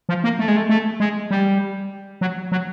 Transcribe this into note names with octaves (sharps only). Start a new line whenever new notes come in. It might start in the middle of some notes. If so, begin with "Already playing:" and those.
F3
A#3
A3
G#3
A3
A3
G#3
G3
F#3
F#3